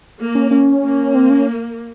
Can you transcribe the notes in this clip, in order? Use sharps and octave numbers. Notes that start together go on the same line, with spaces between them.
A#3
C#4
C#4
A#3
C4
C#4